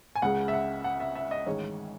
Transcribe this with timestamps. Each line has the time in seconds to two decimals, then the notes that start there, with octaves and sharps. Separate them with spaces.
0.15 G#5
0.22 C#2 C#3 G#3 F#5
0.48 E5
0.53 F#5
0.84 F#5
1.00 E5
1.15 E5
1.31 D#5
1.47 A1 G#2 D#3 G#3 C#5